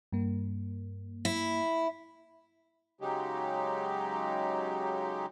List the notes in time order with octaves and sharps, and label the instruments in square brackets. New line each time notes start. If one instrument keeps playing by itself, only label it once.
[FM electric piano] G2 A#3
[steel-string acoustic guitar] E4
[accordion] C#3 F#3 G#3 D#4 G4